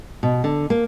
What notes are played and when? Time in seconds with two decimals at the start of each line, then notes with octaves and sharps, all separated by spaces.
0.23 B2
0.44 D3
0.70 A#3